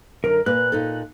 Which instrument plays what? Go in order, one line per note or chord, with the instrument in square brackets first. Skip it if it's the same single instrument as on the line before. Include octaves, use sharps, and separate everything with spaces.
[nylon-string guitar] F#2 D3 [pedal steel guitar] A#4
[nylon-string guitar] A#2 A#3 B4 [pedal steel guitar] F#6
[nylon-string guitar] A#2 D#4 A4